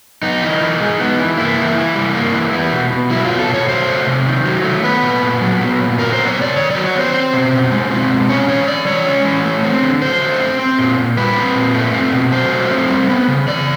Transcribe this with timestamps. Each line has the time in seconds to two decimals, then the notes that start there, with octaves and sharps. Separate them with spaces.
0.22 B3 D#4
0.42 E3
0.61 E3
0.80 G#3
1.00 B3
1.19 E3
1.38 A#3 E4
1.57 E3
1.76 E3
1.95 G3
2.15 A#3
2.34 E3
2.53 B3
2.72 B2
2.92 B2
3.10 F#3 E4
3.25 F4
3.30 B3
3.39 A4
3.49 B2 C#5
3.68 F#3 C5
3.88 A3
4.07 C3
4.26 D#3
4.45 F#3
4.64 A3
4.83 B3 B4
5.03 A#2
5.22 A#2
5.41 F#3
5.61 B3
5.80 A#2
5.99 F#3 A#4
6.13 C5
6.18 B3
6.27 C#5
6.37 C3 D5
6.56 D#3 C#5
6.71 F#3 D5
6.85 C#5
6.95 B3 C5
7.14 C4
7.33 B2
7.52 B2
7.71 G#3
7.91 C4
8.10 B2
8.29 C#4 C#5
8.48 E3 C#5
8.67 E3 D5
8.86 G#3 C#5
9.06 C#4
9.25 E3
9.45 A3
9.63 C4
9.83 D3
10.02 F#3 C5
10.21 A3
10.40 C4
10.59 C4
10.79 A#2
10.98 A#2
11.17 G3 B4
11.36 C4
11.55 A#2
11.75 A3
11.94 C4
12.13 B2
12.32 F#3 C5
12.51 A3
12.71 C4
12.90 G3
13.09 B3
13.28 C#3
13.48 E3 D5